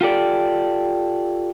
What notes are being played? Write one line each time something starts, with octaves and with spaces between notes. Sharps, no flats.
F4 G4 A4 D5